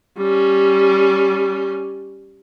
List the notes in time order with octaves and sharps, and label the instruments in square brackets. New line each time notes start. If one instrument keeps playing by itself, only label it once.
[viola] G3 C#4